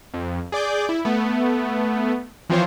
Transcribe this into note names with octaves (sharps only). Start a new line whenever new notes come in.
F2
G#4 D5 D6 G6
E4
A3 B3
E3 F3 C4 F4 C5 C#5